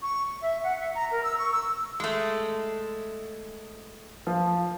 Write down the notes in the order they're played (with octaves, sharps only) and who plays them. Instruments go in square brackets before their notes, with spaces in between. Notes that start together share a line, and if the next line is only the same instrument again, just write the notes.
[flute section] C#6
E5
F#5
E5
A#5
A#4
E6
C#6
E6
[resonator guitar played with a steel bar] G#3 A3
[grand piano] F3